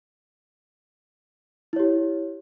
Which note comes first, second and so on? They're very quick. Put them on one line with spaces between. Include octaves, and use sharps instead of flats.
E4 C#5 G4